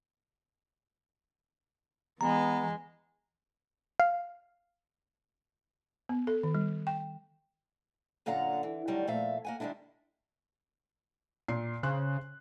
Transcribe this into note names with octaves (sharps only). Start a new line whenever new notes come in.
E3 G#3 B3 A#5
F5
B3
A4
D#3
G3
G5
F#2 A#2 D3 F5 F#5 A#5
E3
D3 D#3 F#3 G3 A3
A#2 F3 A3 E5 F5
A#3 F#5 G#5
D#3 G3 G#3 D4 E4
A#2 C7
C#3 C5 C6 F#6